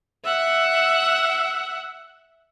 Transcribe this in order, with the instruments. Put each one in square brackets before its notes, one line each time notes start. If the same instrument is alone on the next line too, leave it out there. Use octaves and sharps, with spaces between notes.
[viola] E5 F#5